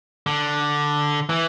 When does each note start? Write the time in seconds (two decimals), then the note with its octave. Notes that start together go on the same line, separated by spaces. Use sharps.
0.26 D3
1.29 E3